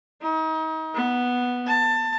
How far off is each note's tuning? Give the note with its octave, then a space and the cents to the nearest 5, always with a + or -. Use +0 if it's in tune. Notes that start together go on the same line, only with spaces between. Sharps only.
D#4 +35
B3 -5
A5 +20